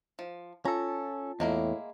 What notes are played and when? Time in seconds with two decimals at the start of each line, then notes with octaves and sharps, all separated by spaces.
0.19 F3
0.65 C#4 F4 A4 A5 A#5
1.40 E2 A2 G#3 A#3 E4